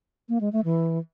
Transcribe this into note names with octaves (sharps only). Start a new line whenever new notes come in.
A#3
G#3
A3
E3